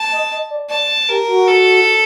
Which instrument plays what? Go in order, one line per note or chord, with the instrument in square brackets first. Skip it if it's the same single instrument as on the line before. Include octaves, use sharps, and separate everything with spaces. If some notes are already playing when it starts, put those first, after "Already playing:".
Already playing: [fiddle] A5
[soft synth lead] D#5
D#5
D5
[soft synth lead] D5 [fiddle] A5
[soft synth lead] G4 [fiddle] A#4
[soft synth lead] F#4
[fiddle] A4